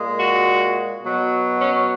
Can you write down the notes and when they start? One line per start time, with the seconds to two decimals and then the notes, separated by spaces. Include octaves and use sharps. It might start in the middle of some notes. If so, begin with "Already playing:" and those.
Already playing: A#2 G#3
0.18 F#4
1.03 B2 F#3
1.61 C#4